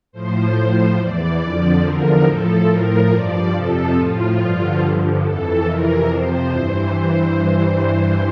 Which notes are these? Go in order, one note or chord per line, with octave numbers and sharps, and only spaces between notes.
A2 F3 C5
A2 F3
E2 E3 D5
F2 D3 F3
E2 D3 F3 A#4
A2 F3 A4
A2 F3 A#4
G2 F3 D5
F2 C3 F3 A4
A2 F3 F4
G2 D3 F3
G2 D3 F3
F2 E3 A4
F2 C3 E3 A#4
F2 C3 F3 C5
G2 E3